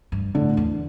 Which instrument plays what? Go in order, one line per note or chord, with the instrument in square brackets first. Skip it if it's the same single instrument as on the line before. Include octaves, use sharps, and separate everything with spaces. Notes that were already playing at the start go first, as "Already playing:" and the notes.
[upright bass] G2
[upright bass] A2 [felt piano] D3
[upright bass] E2